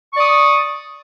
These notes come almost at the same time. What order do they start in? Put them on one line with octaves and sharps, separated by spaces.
C#6 D5 D#6